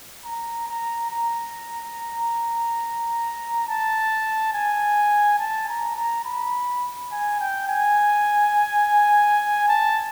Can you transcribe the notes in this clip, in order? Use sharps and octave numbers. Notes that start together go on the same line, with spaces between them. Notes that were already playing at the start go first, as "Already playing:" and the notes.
A#5
A#5
A#5
A5
G#5
A5
A#5
A#5
B5
G#5
G5
G#5
A5